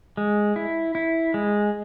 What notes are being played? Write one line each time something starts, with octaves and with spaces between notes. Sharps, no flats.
G#3
E4
E4
G#3